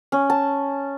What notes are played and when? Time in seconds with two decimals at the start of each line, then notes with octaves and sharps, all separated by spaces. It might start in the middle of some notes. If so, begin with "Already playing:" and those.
0.12 C#4
0.30 A5